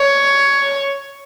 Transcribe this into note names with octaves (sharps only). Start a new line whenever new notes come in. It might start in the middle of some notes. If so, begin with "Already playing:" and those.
Already playing: C#5